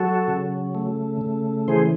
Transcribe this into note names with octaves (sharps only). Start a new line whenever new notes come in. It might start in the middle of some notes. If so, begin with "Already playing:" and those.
Already playing: F#3 F#4 A4
C#3
A3
C#3
E3 G#4 C5